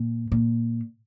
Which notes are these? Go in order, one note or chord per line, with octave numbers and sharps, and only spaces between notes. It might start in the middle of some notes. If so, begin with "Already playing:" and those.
Already playing: A#2
A#2